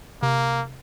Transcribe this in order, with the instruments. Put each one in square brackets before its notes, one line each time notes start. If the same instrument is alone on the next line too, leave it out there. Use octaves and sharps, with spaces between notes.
[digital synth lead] C3 [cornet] A#3